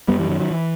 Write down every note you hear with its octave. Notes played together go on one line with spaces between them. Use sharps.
F#2 G3 B3
E3 G3
D#3 F#3
D#3 F#3
E3